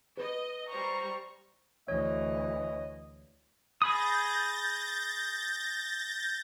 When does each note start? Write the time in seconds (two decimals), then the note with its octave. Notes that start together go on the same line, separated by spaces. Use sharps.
0.17 B4 D#5
0.69 G3 C5 A#5 C#6
1.88 D2 E3 C#5 D#5
3.82 G#4 B5 D#6 G6 A6 A#6